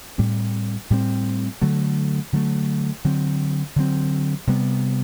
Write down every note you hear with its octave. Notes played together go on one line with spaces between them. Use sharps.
A2 G3 C4
A2 G3 C4
D3 F#3 A3
D3 F#3 A3
D3 F#3 C4
D3 F#3 C4
C3 G3 B3